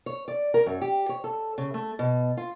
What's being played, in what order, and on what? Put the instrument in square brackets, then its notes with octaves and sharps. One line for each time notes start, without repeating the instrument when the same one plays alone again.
[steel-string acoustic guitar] C#5
D5
A#4
F#2
G4
C#5
A4
C#3
A3
B2
F4